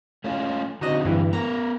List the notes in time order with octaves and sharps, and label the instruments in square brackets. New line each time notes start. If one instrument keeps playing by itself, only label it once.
[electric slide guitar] A3 C#4 F4
[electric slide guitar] D3 C4 [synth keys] D#4 F#4 D#5
[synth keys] G2 E3
[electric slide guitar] B3 A#4 [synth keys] A#5